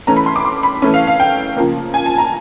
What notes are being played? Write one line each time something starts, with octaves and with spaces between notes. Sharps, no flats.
E3 A3 C#4 A#5
B5
C6
D6
C6
B5
E3 A3 C#4
F5
F5
G5
C#3 F3 A#3
G#5
A5
A#5